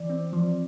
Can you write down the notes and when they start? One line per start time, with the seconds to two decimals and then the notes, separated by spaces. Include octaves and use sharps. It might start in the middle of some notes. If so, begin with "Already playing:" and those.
Already playing: E3 D5
0.09 C4
0.33 F3